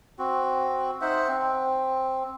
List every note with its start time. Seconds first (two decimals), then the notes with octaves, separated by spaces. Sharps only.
0.19 C4 F#4
1.01 D#4 C5 E5 F#5
1.28 C4